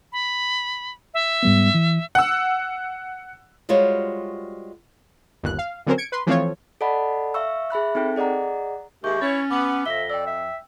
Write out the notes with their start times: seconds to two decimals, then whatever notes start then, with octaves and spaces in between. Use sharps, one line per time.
0.12 B5
1.14 E5
1.43 G#2 G3 B3
1.74 E3
2.15 F#5 E6
3.69 G3 G#3 F4 F#4 C5 C#5
5.43 G1 D#2 F#6
5.59 F5
5.86 D3 F#3 C4 C#4 A#4 C5
5.98 G#6 C#7 D7
6.12 B4 C6
6.27 E3 F3 A3 C4 F4 C#5
6.81 A4 D5 D#5 F#5 A5 B5
7.34 E5 F5 C#6 E6
7.70 G#4 E5 B5 F#6
7.95 C4 D#4 A4 G5
8.16 G#4 D5 D#5 F#5 A#5
9.04 D#2 G#3 G4 E5 C#6 G6
9.21 C#4 E4 B4 C#5 A6
9.51 B3 D6
9.86 F2 E5 A#6 B6 G7
10.10 D5 G5 E6
10.27 E5